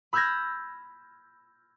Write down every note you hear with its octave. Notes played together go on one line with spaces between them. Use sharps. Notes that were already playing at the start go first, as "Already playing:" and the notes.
B5 E6 F6 G6 G#6 A#6